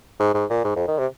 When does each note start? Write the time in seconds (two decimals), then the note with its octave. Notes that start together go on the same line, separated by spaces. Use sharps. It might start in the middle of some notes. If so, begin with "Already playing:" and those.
0.20 G#2
0.34 G#2
0.50 A#2
0.64 G#2
0.76 F2
0.88 D#3
0.98 C3